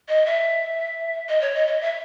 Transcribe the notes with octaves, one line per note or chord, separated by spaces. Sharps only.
D#5
E5
D#5
C#5
D#5
D#5
E5